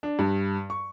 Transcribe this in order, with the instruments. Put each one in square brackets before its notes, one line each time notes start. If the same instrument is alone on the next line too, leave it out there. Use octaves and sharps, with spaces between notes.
[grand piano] D4
G2
C#6